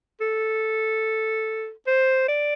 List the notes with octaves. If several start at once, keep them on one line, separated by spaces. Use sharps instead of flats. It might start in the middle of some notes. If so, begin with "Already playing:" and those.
A4
C5
D5